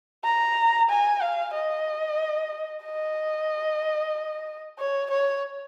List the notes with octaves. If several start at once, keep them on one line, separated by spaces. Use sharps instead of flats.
A#5
G#5
F5
D#5
D#5
C#5
C#5